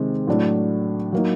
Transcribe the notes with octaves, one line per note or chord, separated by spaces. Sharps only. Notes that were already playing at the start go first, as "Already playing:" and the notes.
Already playing: C3 D#3 G#3
A2 F#3 A3 D4
F#3 A#3 D#4